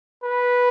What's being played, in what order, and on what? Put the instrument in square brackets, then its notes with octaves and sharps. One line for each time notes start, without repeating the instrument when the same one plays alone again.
[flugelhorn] B4